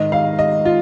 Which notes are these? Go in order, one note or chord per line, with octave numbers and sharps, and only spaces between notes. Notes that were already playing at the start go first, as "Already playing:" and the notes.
Already playing: G#2 D#3 D#5
F5
D#5
F4